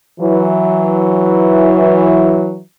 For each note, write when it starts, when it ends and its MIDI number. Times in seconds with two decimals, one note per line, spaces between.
0.20 2.60 52
0.20 2.60 54